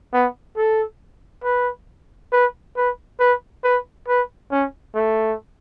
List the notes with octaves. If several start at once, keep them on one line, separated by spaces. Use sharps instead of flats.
B3
A4
B4
B4
B4
B4
B4
B4
C#4
A3